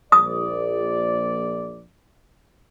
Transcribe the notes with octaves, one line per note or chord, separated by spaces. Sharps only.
A#1 D5 D#6